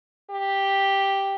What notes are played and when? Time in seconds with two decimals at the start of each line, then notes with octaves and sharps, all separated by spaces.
0.31 G4